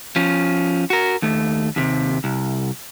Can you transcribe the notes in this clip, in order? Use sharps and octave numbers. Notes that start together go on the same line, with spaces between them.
F3 C#4
F#4 A#4
D#2 A3
D#2 C3
C2